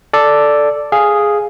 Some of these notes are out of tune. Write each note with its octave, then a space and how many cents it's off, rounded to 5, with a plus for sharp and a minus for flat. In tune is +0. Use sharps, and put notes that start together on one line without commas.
A4 +0 D5 +0
G#4 +0 F5 +0